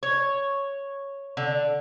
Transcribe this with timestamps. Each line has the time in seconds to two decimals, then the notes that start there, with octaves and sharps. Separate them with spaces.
0.03 C#5
1.37 D3